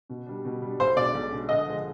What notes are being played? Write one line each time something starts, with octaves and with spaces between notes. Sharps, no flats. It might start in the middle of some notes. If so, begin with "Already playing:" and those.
B2
G3 D4
B2
G3 D4
B1 C5
B2 G#3 D4 D5
B1
B2 G#3 D4
D3 D#5
F3 G#3